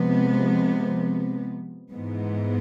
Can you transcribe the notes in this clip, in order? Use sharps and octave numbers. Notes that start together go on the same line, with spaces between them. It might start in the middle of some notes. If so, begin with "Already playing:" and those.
Already playing: C3 F3 G#3 B3
G#2 E3 G#3 B3